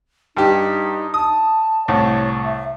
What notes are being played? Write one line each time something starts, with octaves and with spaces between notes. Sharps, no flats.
G2 D#4 G4
A5 D#6
C2 A2 C#5
E5